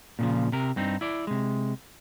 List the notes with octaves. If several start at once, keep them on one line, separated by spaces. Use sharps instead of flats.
A#2 C#3 F3
C3 A#4
G2 C4 D#4
E4 D5
C3 G#3